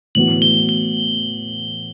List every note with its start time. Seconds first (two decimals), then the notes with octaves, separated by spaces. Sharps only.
0.15 A2 E3 B3 F#4 F#7
0.42 G7
0.69 G7